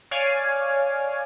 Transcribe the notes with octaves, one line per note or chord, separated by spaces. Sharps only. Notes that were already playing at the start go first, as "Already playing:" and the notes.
C#5 D5 F5 G#5